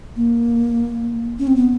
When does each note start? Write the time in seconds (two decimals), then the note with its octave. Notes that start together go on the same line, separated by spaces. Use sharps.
0.16 A#3
1.39 C#4
1.47 C4
1.56 B3